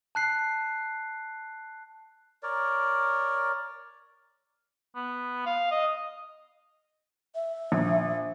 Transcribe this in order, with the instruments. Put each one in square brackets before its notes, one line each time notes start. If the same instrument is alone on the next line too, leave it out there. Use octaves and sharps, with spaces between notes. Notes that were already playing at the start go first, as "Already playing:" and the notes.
[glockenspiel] A5 F#6 C7
[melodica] A#4 C#5 D5
[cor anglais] B3
F5
D#5
[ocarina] E5
[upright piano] A#1